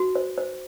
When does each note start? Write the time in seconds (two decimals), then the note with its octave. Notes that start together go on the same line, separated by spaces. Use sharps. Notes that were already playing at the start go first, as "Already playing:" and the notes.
Already playing: F#4
0.15 C5
0.38 C5